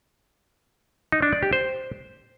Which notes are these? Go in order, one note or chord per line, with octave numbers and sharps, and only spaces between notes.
D#4
D4
D5
G4
C5